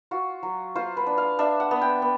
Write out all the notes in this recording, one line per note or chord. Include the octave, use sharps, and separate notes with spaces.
F4 F#4
F#3
F4 C5
B4
D4
F5
D4 E5
F#5
B3
G5
B3